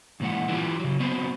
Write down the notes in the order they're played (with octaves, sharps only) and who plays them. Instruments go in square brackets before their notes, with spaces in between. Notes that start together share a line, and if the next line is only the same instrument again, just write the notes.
[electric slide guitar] E2 A#2 E3 G#3 F#5
E3 G3 A#3 F4 G4
C#3 F#3
F#3 B3 C4 F#4